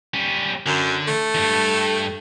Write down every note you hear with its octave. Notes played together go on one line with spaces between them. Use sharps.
G3 C#4
F#2 D3
A3
E2 G2